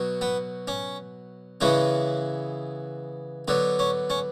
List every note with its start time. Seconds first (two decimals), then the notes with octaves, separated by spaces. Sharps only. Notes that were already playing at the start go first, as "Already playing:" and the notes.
Already playing: B2 F#3
0.21 B3
0.68 C#4
1.61 C#3 E3 G#3 B3 C#4
3.48 D3 F#3 B3
3.79 C#4
4.10 C#4